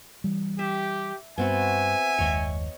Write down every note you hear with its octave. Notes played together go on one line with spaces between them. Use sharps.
E3 G3
G4 E5
G2 B3 C4 F#4 E5 G#5
F#1 D#2 G#3 C#5 D#5